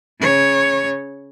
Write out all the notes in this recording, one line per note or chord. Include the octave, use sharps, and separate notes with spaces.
C#3 C#5